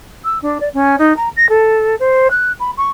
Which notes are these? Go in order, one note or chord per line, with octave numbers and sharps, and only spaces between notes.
E6
D4
D5
C#4
D#4
A#5
A#6
A4
C5
F#6
B5
C#6